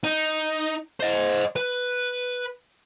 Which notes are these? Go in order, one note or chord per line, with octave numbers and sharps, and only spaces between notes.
D#4
C5 D#5
B4